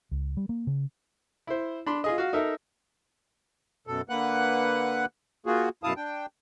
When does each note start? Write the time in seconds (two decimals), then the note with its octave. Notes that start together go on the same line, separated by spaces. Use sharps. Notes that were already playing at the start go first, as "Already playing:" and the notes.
0.11 C#2
0.37 G3
0.49 A#3
0.67 C#3
1.47 E4 C5
1.86 D4 B5 C6
2.04 F4 G#4 D#5
2.18 F#4 F5
2.33 D#4 A4 A#4 E5
3.87 F#2 B2 A4
4.09 D3 A#3 B4 F#5 F#6
5.46 A#3 F4 F#4 G#4
5.83 F#2 B2 E4 F5 A5 D#6
5.96 D4 G5